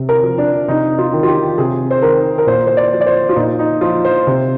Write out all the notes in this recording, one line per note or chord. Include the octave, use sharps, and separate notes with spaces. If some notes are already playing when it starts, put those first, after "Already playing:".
Already playing: C3
A#4
F3
D4
C3 D#4
F4
D#3
F4
G4
C3 G#4
C5
D#3 A#4
A#4
A#2 C5
C5
D5
F3
D5
C5
F4
A#2 D#4
D#4
F3 F4
C5
C3